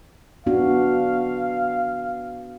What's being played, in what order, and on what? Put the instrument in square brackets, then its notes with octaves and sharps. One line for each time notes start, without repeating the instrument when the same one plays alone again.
[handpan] B3 D4 F#4 [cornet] F5